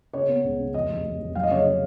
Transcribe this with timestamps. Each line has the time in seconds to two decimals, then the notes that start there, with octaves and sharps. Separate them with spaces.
0.13 C#3 C#5
0.29 B3
0.44 C#2
0.59 C#3
0.74 F1 D#5
0.89 F1
1.05 F1
1.20 F1
1.35 F#3 F5
1.43 D#5
1.51 C#3 C#5
1.59 D#5
1.66 C#3